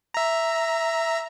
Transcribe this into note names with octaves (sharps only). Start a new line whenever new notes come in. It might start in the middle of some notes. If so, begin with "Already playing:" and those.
E5 A#5